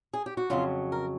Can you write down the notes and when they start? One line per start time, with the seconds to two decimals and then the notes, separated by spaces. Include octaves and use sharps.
0.13 G#4
0.26 G4
0.37 F#4
0.50 F2 C#3 F#3 F4
0.92 A#4